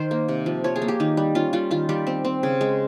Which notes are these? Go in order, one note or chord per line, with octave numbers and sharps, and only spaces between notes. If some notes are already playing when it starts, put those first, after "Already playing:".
Already playing: D#3 C5
A#3
C3
F3
F3 C#5
G#4
A#3
G4
D#3 D#4
G3
C#4 F4
G3 F4
D#3 F4
G3 G4
C4
C4
C#3
G#3